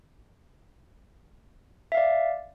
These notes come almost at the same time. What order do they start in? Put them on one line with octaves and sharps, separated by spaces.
E5 F5 D5